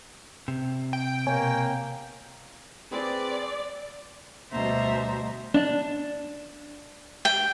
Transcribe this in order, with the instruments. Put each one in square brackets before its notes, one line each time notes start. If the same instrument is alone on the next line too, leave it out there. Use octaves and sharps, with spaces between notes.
[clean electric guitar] C3
[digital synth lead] G5
[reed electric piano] B2 C#5 G#5 [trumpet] A#3
[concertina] C4 G#4 B4 [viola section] D5
[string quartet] D2 B2 G3 C5 E5 A#5
[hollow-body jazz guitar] D4
[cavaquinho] G5